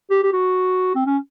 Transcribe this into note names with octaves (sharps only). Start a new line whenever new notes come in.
G4
G4
F#4
C4
C#4